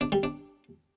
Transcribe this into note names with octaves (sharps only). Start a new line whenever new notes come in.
D4
G3
D4